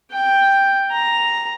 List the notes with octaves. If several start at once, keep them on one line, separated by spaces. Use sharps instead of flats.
G5
A#5